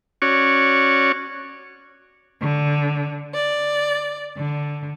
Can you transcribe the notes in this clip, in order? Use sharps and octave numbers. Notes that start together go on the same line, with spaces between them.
C#4 F#4 C#5 D5
D3
D5
D3